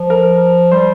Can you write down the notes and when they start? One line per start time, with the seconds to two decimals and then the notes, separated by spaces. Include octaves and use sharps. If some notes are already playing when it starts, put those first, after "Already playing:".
Already playing: F3
0.10 A#4
0.72 G3 C5